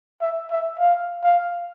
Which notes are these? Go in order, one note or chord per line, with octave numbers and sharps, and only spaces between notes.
E5
E5
F5
F5